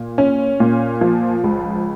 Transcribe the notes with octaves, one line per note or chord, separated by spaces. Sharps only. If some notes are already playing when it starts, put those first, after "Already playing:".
Already playing: A#2
C#4
A#2
F3
C#2